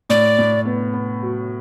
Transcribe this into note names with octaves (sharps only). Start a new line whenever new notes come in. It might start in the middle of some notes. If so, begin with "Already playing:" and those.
A2 D5
A2
B3
B3
F#3